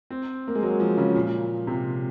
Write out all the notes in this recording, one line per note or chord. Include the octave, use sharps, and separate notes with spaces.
C4
A#3
G#3
F#3
F3
C#3
A#2
C3